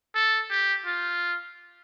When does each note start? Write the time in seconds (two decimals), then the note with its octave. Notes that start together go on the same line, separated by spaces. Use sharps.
0.14 A4
0.50 G4
0.86 F4